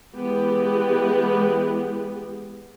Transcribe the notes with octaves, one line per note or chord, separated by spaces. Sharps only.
E3 G#3 B3 G4